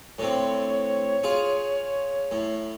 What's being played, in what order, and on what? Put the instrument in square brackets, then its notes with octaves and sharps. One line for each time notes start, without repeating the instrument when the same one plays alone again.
[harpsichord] A2 D3 C4 [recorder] C#5
[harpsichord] F4 G#4
A2